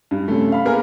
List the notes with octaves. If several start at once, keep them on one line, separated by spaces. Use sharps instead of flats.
G2
F#2 C3 A3
F5 B5
A#3 B3 G#4 A#4